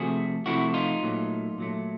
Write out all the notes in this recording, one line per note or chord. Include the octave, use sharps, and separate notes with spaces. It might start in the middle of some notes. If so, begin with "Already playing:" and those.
Already playing: C3 F3 A3 F#4 G#4
C3 F3 A3 E4 F#4
D#4 F4
A#2 F#3 A3
A#2 F#3 A3